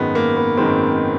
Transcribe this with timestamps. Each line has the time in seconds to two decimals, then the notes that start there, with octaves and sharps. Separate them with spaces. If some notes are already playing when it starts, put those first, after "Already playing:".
Already playing: G#1 F#2 D#3 G#3 B3
0.15 A#3
0.37 B3
0.57 G#1 F#2 D#3 G#3 C4